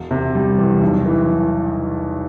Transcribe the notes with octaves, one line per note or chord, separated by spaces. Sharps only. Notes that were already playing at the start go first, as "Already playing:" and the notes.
Already playing: E1
C3
G3
E2
B1
E3